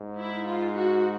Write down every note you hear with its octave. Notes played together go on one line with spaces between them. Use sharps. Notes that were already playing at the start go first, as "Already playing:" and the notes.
Already playing: G#2
E4
F4
F#4